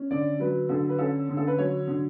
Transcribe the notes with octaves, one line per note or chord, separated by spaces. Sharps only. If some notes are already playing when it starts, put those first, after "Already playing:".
Already playing: C#4
D3 D5
F#3 B4
D3 A4
B4
C#4 A4
D3
A4
B4
F#3 C#5
D3